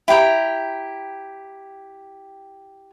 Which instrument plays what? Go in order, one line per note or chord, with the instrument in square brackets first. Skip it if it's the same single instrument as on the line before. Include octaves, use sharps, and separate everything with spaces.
[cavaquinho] E4 G4 G5 A#5